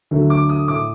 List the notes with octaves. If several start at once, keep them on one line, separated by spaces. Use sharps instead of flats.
D2 D3 F#3 A3
D6
D#6
A2 A3 D6